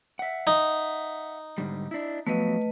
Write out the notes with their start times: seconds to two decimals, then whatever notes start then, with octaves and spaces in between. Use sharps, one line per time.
0.19 E5 F#5
0.47 D#4
1.58 G#2 D3 G3
1.91 D4 E4
2.27 F3 F#3 A3 B3 B4 D#5